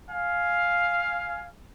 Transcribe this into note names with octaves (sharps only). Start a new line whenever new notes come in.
F5 G#5